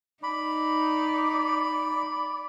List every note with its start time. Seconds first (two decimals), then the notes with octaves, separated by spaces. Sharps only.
0.23 D#4 D5 B5